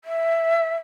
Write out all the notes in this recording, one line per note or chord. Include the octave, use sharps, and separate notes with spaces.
E5